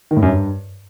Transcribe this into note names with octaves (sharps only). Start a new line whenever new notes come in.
D#3
A2
F#2
G2